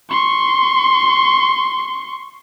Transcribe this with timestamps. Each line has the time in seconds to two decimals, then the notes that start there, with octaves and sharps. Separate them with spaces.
0.11 C6 C#6